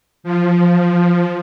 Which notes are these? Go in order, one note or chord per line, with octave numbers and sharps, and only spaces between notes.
F3